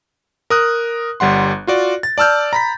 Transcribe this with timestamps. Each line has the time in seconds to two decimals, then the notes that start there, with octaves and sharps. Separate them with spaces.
0.50 A#4 D#6 F#6
1.20 G1 G3 F#5 C6
1.67 F4 F#4 D5
2.03 A6
2.18 D5 A5 E6 F6 G6
2.53 A#5 B5 B6